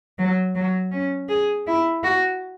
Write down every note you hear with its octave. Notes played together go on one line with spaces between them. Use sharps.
F#3
F#3
C#4
G#4
E4
F#4